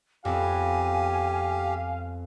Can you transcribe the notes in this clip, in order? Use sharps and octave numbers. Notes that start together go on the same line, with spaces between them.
F2 B3 G4 F5 G#5